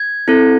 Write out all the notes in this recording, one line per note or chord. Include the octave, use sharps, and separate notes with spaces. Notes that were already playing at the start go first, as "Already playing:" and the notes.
Already playing: G#6
C4 E4 A4